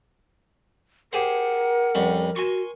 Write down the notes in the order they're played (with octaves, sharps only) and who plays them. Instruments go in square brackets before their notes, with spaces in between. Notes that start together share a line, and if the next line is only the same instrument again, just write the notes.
[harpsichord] G4 G#4 C5 [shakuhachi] A#4 [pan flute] F#5
[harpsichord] F2 G3 C#4
[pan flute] F#4 [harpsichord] G#5 C6 C#6